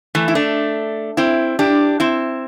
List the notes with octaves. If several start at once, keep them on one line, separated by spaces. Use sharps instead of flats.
E3 A3
E4
A3 D4
C4 E4
D4 G4
C4 E4